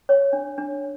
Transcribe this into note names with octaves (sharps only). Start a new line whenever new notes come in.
C#5
D4
D4